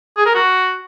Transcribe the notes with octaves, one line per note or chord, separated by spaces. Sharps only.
G#4
A#4
F#4